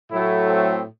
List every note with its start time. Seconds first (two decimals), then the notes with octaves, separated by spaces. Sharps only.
0.11 A2 F#3 A3 E4
0.47 C4